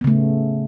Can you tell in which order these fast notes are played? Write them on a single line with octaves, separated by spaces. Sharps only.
B3 C#3 A3